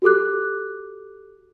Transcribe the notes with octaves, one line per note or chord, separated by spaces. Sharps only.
F#4 G4 A4 D6 F#6